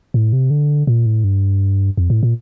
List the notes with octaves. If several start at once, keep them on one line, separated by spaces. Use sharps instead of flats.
A2
C3
D3
A#2
A2
G2
F2
A2
A#2